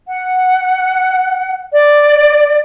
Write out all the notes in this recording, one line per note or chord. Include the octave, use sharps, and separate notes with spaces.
F#5
D5